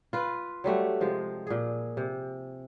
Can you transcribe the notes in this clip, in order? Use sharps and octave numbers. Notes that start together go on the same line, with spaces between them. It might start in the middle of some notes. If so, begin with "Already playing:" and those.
F4 B4
F#3 G3 A3 F#4
C3 F3 G#3
A#2 G#4
C3